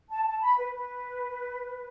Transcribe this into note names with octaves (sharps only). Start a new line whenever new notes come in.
A5
A5
B5
B4
B4